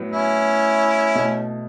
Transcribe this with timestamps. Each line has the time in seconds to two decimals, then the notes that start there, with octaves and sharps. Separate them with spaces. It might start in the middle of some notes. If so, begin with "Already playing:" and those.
Already playing: A2 F#3 B3
0.11 C#4 E4
1.15 B2 A3